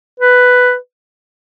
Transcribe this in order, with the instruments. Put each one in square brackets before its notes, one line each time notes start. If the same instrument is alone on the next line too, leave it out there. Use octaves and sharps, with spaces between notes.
[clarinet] B4